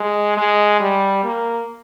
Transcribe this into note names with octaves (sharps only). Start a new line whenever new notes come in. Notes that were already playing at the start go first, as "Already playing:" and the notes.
Already playing: G#3
G#3
G3
A#3